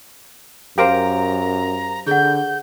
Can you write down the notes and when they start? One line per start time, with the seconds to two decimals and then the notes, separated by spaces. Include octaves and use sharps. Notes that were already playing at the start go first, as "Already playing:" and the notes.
0.78 F#2 G4 A#4 C5 F5 A#5 D6 D7
2.07 D3 G#4 F#5 G6